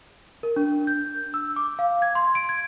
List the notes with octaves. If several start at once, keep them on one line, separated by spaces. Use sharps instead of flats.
A#4
D4
G6
E6
D6
F5
G#6
C6
D7
G#6